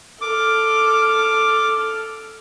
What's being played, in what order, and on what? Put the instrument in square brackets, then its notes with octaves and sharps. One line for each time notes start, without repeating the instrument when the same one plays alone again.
[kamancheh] A4 F6 [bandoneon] D6